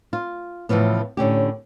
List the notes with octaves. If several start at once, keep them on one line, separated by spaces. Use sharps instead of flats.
F4
A2 C#3 E3 F3 B3
A2 D3 C#4 G4